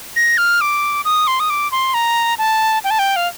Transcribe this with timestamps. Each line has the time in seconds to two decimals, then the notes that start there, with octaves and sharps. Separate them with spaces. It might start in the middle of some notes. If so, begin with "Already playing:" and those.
0.16 A#6
0.38 F6
0.61 D6
1.05 D#6
1.27 C6
1.40 D#6
1.50 D6
1.72 C6
1.94 A#5
2.38 A5
2.84 G5
2.91 A5
2.99 G5
3.16 F5